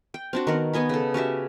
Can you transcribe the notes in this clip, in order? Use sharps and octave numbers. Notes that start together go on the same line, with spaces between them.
G5
C4 D4 F#4
D#3 B3 A#4 F#5
B3 D#5 G#5 B5
C#3 A4
C#4 F#4 G4 E5